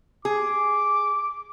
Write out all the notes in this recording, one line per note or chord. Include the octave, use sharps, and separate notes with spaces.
G#4 D6